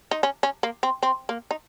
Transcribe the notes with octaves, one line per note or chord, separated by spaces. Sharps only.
D#4
C#4
C#4
A#3
C4
C4
A#3
D#4